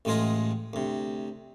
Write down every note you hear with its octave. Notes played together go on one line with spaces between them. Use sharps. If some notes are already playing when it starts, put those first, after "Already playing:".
A1 A2 G#3 F4 G#4 D#5
D2 C3